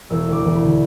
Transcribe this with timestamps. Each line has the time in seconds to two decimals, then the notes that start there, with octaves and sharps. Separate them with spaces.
0.10 E1 E6
0.27 D2
0.32 D6
0.44 E1
0.55 B5
0.61 D3